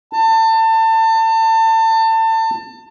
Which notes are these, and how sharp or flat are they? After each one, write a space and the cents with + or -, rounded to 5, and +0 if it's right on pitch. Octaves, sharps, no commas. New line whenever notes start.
A5 +30